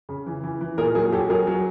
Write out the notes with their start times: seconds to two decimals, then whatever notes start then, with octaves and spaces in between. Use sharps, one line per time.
0.09 C#3
0.26 E3
0.43 E3
0.61 E3
0.78 A#2 G#4 A#4
0.95 F#3 G#4 A#4
1.12 F#3 G4 A4
1.29 F#3 G#4 A#4
1.47 F#3